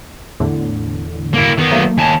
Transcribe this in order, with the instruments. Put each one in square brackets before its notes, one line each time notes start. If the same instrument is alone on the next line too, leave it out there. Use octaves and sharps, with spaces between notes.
[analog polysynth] E2 A2 D3
[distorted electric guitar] A#3 E4
D#3 B3
[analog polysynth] F#3 A3 A#3
[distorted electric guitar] D#2 A5 [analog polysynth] G#5